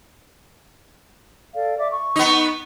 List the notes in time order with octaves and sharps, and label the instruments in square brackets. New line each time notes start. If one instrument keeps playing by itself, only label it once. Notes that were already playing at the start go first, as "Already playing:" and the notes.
[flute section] A4 D5 F5
D5 E5 D6
C#6
[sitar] B3 D#4